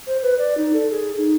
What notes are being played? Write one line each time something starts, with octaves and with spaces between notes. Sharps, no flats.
C5
B4
D5
D#4
A4
G#4
D#4